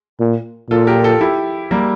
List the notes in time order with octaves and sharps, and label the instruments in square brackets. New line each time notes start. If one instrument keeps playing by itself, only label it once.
[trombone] A#2
[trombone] A#2 [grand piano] F4 A4
[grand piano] G4 A#4
F4 A4
E4 G4
G3 A#3